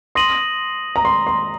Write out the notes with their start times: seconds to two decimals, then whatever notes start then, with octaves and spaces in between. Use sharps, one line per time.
0.15 C6 D#6 A#6 D#7 F#7
0.96 A#5
1.05 C6
1.27 C6